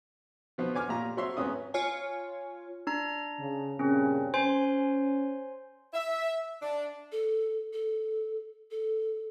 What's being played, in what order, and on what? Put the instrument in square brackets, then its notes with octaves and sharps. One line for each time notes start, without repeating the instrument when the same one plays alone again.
[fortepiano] B2 F3 B3
C#5 G#5 D6 F6
A#2 F4 G4 A#5
F#3 C4 C#5 E5 C6
G#1 B3 C#4 D#6
[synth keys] F4 C#5 G#5
[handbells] D4 A#5
[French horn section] C#3
[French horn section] G2 A#2 C#3 [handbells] C4 C#4
[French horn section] C#4 [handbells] C5 G#5 C6
[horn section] E5
D4
[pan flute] A4
A4
A4